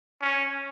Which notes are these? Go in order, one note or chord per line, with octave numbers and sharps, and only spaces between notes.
C#4